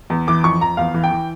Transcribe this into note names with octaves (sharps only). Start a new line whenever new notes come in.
E2
E3 D6
F2 C#6
F2 A#5
E2 F5
E3
G5
E3